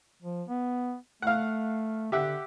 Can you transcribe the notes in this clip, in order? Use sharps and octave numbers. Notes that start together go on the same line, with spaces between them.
F3
B3
A3 F5 F#5
D3 G4 E5 F#5